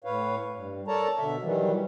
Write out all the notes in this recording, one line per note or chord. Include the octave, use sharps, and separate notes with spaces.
A2 B4 C#5 F5
G2
A4 A#4 C#5 D5 A5 A#5
B2 D3 E5
D#3 E3 F#3 G3